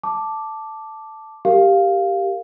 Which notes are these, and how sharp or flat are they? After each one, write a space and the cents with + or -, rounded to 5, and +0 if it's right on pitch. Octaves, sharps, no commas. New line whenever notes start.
A5 +0 D6 +0
G4 +0 A#4 -25 F5 +0